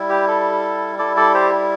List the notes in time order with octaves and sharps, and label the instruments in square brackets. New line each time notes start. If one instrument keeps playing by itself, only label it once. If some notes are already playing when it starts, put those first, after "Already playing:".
Already playing: [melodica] G3 E4
G4
A4
G3 E4 A4 D5
A4 D5
G4 C5